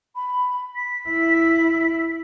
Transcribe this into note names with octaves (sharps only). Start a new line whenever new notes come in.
B5
B6
E4